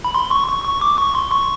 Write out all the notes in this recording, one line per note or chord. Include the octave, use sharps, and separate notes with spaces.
B5
C6
C#6
C#6
C#6
D6
C#6
C6
C#6